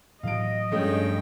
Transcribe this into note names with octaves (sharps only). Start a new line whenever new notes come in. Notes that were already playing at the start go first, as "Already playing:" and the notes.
A2 E3 F#3 D#5 F5 D7
G2 F3 G#3 A3 C#4 G5